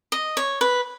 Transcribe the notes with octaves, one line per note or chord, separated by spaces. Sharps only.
D#5
C#5
B4